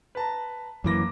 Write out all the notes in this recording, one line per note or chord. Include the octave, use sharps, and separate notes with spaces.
B4 A5 A#5
F#2 E3 A#3 D6 A#6